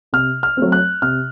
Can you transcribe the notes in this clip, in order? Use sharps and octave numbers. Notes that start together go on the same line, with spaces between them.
C3 F6
F6
F#3 A3 C4
F#6
C3 F6